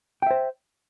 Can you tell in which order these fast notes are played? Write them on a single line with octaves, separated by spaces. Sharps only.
G5 E5 C5